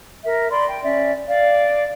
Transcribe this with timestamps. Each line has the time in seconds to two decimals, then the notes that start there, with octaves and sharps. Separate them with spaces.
0.24 A#4 E5
0.51 D5 B5 C6
0.69 G5
0.83 C#4 D5 E5
1.28 D5 F5